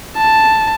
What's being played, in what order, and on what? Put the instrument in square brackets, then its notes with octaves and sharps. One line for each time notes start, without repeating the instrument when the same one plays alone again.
[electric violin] A5